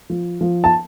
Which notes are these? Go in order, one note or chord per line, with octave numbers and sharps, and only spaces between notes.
F3
F3
A5